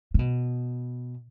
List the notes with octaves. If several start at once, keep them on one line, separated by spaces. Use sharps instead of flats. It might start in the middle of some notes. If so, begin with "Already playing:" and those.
C3
B2